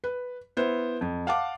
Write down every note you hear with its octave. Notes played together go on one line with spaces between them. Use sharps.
B4
B3 E4 C5
F2
F5 F#5 A5 D6